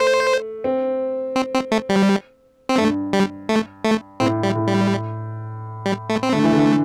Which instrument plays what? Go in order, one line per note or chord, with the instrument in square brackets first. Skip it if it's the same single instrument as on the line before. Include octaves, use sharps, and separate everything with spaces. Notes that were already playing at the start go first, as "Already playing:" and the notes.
Already playing: [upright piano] A3 [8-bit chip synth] C5
[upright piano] C4
[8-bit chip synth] C4
C4
A3
G3
C4
[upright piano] G2 [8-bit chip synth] A3
[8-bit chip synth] G3
A3
A3
[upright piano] A2 [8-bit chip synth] C4
[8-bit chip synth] G3
[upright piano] A2
[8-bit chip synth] G3
G3
A3
C4
[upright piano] D3 [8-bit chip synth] A3
[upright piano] E3
D3